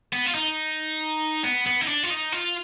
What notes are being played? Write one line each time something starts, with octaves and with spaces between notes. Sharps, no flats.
B3
F4
D#4
B3
B3
D#4
D4
F4
D#4
F4